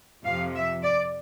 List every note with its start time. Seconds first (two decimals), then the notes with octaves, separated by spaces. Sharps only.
0.25 F2 C3 F3 F5
0.55 E5
0.83 D5